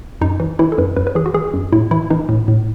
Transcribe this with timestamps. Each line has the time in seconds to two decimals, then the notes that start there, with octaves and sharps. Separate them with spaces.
0.21 F#2 D#4
0.40 E3
0.59 E3 E4
0.72 A4
0.78 F#2 B4
0.96 F#2 B4
1.07 B4
1.15 E3 G#4
1.26 F#4
1.34 E3 G#4
1.54 F#2
1.72 A2 E4
1.91 E3 E4
2.10 E3 D#4
2.29 A2
2.48 A2